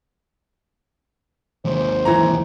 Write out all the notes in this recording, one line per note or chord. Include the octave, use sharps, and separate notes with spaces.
D#2 G#3 C5
E3 A#5